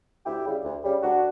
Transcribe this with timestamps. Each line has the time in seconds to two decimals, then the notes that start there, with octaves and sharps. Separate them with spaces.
0.25 D2 E4 G4
0.44 C#3 G3
0.64 D2
0.83 C#3 G3
1.02 D2 D4 F#4